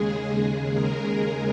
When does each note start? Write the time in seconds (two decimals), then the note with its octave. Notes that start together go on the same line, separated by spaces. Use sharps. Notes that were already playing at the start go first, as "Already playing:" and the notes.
Already playing: D#2 C#3 G#3 G#4
0.42 G#4
0.73 A#4
1.03 G#4